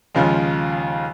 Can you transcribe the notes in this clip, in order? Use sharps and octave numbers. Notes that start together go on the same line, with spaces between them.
D#2 C#3 F3 G#3